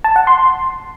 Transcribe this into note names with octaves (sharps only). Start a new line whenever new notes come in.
A5
F#5
C6